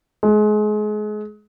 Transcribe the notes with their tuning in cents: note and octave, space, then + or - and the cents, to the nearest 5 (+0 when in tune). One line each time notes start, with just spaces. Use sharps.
G#3 +30